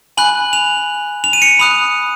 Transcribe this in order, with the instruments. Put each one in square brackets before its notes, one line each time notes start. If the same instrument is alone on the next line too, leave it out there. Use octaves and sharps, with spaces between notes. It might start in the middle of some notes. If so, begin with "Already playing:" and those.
[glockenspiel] G#5 B5 F#6 F#7
F7
F7
D#7
C#7
B5 D#6 F#6 F7